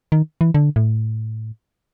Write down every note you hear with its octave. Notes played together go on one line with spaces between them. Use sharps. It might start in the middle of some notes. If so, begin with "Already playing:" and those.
D#3
E3
D3
A2